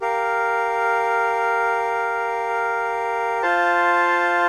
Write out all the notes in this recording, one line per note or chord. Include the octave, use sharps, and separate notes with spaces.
G4 A#4 F5
F4 C5 F5 A5